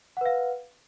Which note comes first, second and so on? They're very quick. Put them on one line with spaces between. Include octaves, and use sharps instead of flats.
F#5 B4 F5